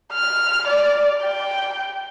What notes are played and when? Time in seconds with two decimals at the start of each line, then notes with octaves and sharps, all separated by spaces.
0.13 F6
0.67 D5
1.23 G5